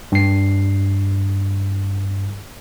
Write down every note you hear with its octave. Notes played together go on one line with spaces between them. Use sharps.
G2 C7